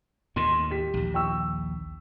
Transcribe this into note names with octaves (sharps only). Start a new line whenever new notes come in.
D#2 A2 D#3 C6
G4 B6
A#1 D#2
G5 C#6 E6